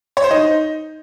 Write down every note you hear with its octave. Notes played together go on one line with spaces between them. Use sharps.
C#5
C5
D#4